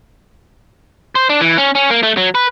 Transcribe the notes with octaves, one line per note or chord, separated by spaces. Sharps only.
C5
D4
E3
C#4
C#4
A#3
A3
F#3
B4